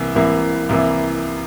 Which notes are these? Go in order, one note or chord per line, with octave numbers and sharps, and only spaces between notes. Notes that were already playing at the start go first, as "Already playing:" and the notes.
Already playing: C2 C3 E3 A#3 E4
C2 C3 E3 A#3 E4
C2 C3 E3 A#3 E4